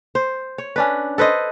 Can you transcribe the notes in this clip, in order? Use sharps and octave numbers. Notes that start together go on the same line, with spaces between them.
C5
C#5
C#4 D4 B4
A4 B4 C5 D#5